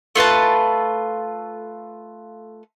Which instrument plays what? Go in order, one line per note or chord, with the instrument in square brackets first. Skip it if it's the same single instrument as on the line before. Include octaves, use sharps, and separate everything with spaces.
[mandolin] A3 F4 B4 A5